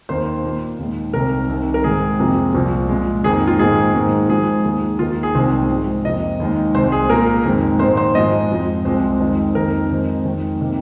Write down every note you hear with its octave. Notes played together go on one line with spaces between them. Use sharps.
D#2 D#3 A#3 C5
A#2 A#3
D#2 D#3 G#3
C2 C3 D#3 A#4
C2 C3 D#3
A#4
G#2 D#3 G#3 G#4
F2 C3 F3 A#3
C2 A#2 F3
A#2 G#3
F2 D#3 A#3 G#4
F4
G#2 D#3 A#3 G#4
G#2 D#3 A#3
G#2 F3 G#3 G#4
D#2 D#3 A#3
D#2 D#3 A#3 F4
G#4
C2 C3 D#3 G#3 C5
G#2 F3 G#3
F2 C3 F3 A#3 D#5
D#2 D#3 G#3
C2 C3 G#3 C5
G#4
A#2 A#3 A#4
F2 D#3 G#3
G#2 D#3 A#3 C5
C5
G#2 F3 G#3 D#5
F2 F3 G#3
C2 C3 F3 G#3 C5
F2 D#3 G#3
F2 D#3 A#3 A#4
F2 D#3 G#3
F2 D#3 G#3
C3 D#3 A#3